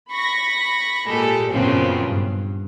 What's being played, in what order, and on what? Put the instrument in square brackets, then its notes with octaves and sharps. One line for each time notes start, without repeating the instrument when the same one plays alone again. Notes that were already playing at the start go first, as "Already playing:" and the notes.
[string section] B5 C#6 A#6
A#2 G#3 G4 A4
F#2 A#2 C#3 F3 B3 C4
G2